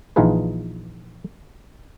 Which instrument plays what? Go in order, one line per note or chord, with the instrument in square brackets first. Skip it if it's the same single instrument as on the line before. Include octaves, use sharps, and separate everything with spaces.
[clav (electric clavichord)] A#1 E3 D#4 F4 G#4 B4